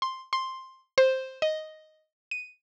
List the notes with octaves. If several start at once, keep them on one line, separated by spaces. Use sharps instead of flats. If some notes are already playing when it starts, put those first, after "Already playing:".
C6
C6
C5
D#5
D#7